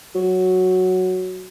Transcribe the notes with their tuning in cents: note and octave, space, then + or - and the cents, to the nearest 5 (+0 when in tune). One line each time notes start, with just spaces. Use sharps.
F#3 +0